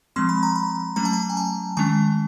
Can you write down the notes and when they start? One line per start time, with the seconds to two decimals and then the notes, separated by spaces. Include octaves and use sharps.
0.16 F3 G#3 C4 C6
0.29 B5
0.43 A#5
0.56 B5
0.96 F#3 A3 C#4 A#5
1.05 A5
1.13 A#5
1.30 G#5
1.37 A5
1.77 D#3 G#3 C#4 A5